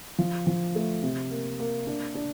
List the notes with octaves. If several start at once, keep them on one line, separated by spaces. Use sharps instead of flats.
F3
F3
A3
C3
A#3
A#3
D4
D4